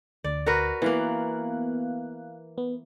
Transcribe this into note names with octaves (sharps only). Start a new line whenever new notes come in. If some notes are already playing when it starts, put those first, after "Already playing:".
D2 D5
F#4 A#4 B4
E3 A#3 B3 F5 F#6
B3